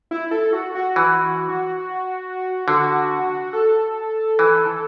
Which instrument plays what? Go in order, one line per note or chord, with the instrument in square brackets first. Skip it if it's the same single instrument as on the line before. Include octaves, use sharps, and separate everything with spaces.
[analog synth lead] E4
A4
F#4
F#4
[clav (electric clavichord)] E3
[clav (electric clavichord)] D3 [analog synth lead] F#4
[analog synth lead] A4
[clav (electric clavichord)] E3